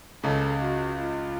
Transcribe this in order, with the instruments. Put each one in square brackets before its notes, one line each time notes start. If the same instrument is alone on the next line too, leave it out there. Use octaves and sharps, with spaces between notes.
[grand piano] C#2 C#3 [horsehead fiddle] A4
[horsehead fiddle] F#4
F4